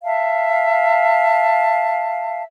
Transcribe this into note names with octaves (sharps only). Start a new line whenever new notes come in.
E5 F5 A5